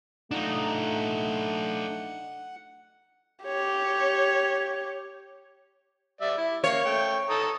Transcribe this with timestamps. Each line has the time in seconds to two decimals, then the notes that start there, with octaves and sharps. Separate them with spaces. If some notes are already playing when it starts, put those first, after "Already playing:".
0.31 A3 D4 D#4 F4 F#5
3.45 G4 C#5
6.21 G3 D5 E5
6.37 E4
6.64 A#3 C#5 F5
6.85 A3 G5
7.30 A4 A#5 D#6